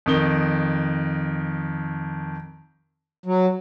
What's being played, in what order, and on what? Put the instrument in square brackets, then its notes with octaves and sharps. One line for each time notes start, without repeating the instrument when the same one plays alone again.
[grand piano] F2 D#3 G7
[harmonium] F#3